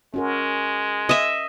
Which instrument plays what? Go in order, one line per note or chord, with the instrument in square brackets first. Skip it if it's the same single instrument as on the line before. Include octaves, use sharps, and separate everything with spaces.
[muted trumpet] G#3 [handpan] C#4 F#4 A#4
[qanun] D#5 E5